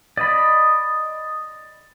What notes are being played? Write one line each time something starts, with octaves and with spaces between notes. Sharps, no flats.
D5 D#5 B5